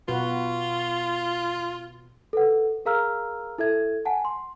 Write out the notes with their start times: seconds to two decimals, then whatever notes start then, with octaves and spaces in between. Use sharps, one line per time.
0.08 B2 F4 F#4 B4
2.33 A4 B4 F#5
2.85 G#4 A#4 F5 A#5 E6 F6
3.58 E4 A4 E5 G#6
4.05 F#5 G#5 A5
4.25 C6